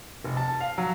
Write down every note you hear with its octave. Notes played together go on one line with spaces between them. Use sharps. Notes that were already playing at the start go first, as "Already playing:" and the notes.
F1
A5
F5
F#3